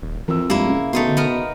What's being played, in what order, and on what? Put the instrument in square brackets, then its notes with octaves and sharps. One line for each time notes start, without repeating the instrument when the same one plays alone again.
[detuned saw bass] D#1
[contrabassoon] F2 [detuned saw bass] E3 [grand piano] A#4 E6
[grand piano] G2 [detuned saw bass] G#3 [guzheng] A#3 E4
[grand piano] C#3
[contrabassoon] B2 [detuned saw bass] D3 [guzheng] A3 D#4 C6
[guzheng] B3 A#4